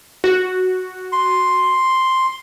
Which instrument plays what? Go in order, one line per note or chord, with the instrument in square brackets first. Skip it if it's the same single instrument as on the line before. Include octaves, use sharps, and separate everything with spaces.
[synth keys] F#4
[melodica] C6